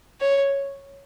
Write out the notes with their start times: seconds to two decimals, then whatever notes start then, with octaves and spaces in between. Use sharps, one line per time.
0.21 C#5